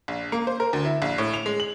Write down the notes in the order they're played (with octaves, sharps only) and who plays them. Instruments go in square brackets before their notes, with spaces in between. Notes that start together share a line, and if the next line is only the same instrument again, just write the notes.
[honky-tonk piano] A#1
A#3
C5
A#4
D2
E4
A#1
A2
F7
G#3
F#7